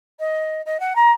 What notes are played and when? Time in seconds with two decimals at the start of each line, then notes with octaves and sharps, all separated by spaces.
0.19 D#5
0.66 D#5
0.80 F#5
0.96 A#5